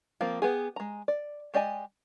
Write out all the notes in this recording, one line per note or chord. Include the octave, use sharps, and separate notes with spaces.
F3 A#3 C4 F4
B3 G4 G#4
G#3 A#5
D5
G#3 G4 D5 D#5 G#5